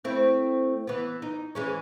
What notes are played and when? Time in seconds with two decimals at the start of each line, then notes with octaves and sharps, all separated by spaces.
0.04 A3 C4 E4
0.87 E3 B3
1.22 D#4
1.55 E3 G#3 C#4